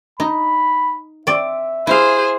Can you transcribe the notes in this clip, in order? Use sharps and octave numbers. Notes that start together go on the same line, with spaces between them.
D#4 B5
C4 D5 E5
E4 G#4 C5 F5